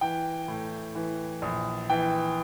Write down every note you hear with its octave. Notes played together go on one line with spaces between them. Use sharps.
E3 G5
A2
E3
A#1
E3 G5